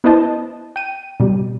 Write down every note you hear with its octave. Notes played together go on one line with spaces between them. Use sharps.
B3 E4 B4 C5 D#5 A5
G5 D#7
B2 G3